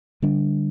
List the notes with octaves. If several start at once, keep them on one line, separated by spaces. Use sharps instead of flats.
D3 G3 D4